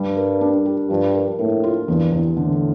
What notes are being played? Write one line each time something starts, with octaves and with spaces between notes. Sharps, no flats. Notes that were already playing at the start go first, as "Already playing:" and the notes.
Already playing: G2 G3
A#4
D4
G4
G2 F3
A#4
A2 A#3
F4
E2 G2
E2
A2 D3